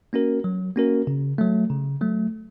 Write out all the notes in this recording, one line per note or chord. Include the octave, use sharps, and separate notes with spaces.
A#3 C#4 F#4 A#4
F#3
A#3 C#4 F#4 A#4
C#3
F#3 A3
C#3
F#3 A3